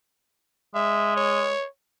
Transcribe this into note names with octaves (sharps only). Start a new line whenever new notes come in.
G#3 E5
C#5